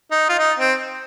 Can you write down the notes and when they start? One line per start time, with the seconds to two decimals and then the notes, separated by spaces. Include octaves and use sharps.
0.12 D#4
0.29 F4
0.39 D#4
0.59 C4